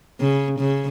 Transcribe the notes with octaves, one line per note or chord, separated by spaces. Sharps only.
C#3
C#3